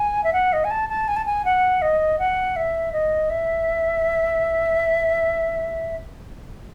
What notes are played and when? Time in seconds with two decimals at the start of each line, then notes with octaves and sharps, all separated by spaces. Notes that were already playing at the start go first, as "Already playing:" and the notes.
Already playing: G#5
0.24 E5
0.33 F#5
0.53 D#5
0.64 G#5
0.70 A5
0.89 A5
1.08 G#5
1.16 A5
1.25 G#5
1.45 F#5
1.82 D#5
2.19 F#5
2.56 E5
2.93 D#5
3.30 E5